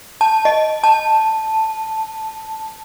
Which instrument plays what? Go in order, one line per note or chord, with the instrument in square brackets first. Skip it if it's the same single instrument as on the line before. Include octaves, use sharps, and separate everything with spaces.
[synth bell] A5
D#5
A5